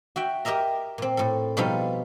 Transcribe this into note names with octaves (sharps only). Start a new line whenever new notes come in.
F#4 E5 G5
G4 A#4 D#5 E5 A#5
A#2 C4
A2 A4
B2 F3 G3 D#4 F4 A4